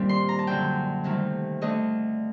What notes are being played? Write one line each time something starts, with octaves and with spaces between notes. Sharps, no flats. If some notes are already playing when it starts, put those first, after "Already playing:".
Already playing: G2 A#2 D#3 G3 C4 D4
C6
A#5
A5
F#2 D3 F#3 G5
D2 C3 D#3 G3
D2 D3 A3 D4 D#5